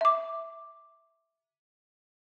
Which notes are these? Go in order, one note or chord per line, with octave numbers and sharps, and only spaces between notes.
E5 D6